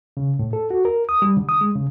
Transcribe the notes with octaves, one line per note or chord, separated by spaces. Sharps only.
C#3
A2
A4
F#4
A#4
D#6
G3
D3
D#6
G#3
C#3